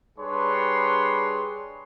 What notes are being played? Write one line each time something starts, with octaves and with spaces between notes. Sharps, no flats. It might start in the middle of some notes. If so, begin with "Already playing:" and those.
G3 D4 G#4 B4 C#5 C6